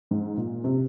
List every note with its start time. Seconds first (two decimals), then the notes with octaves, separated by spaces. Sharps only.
0.11 G#2
0.37 A#2
0.64 C3